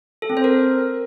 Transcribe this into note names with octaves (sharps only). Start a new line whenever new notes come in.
A4
C4
C5
A#4